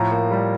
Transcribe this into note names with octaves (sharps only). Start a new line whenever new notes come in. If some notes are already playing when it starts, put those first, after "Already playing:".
Already playing: A2 F3 A#5
A#3
G3